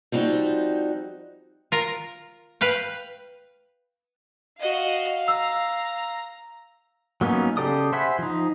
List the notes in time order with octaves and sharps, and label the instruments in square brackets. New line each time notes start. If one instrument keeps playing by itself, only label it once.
[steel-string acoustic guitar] F3 G3 C4 D#4 F#4
[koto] F4 A#4
B4 F5 G5
[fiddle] F#4 D#5 [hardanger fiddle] F5
[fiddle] A#5 [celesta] E6
[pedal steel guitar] F#3 A#3 B3 C#4 D#4
C#3 G4 A4 D5 D#6
C5 E5 F#5 G#5 B5
F3 D#4